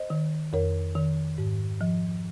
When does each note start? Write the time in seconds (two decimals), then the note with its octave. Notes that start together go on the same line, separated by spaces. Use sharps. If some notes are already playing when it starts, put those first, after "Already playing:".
Already playing: C5 D#5
0.10 D#3
0.53 F2 A#4 C#5
0.95 D#3
1.38 G#2
1.81 F3